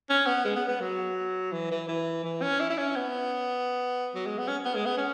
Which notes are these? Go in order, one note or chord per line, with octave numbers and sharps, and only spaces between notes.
C#4
B3
G#3
B3
B3
F#3
E3
E3
E3
E3
C#4
E4
E4
C#4
B3
F#3
G#3
B3
C#4
B3
G#3
B3
C#4